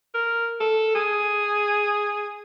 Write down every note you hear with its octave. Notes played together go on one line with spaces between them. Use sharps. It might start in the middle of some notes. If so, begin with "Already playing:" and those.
A#4
A4
G#4